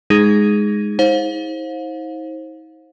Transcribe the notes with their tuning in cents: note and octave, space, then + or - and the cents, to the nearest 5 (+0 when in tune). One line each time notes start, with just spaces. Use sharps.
G#3 +0 D#4 +0 G#4 +0
D#4 +45 C5 +25 F5 +35